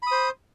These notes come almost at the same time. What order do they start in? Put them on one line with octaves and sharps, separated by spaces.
B5 D#6 C5